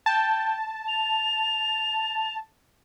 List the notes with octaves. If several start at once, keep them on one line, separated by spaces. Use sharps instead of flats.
G5 A5
F7